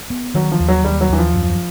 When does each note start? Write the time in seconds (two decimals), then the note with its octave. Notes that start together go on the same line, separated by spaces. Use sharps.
0.10 B3
0.35 D#3 F#3
0.52 F3
0.60 D#2
0.68 F#3
0.84 D#2 G3
1.01 F#3
1.09 D#2 E3
1.18 F3
1.34 F#2